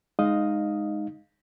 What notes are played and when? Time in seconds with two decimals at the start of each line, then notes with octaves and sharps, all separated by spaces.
0.19 G#3 D#4 D#5 F5 D#6